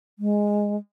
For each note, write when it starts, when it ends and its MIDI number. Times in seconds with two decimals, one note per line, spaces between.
0.19 0.77 56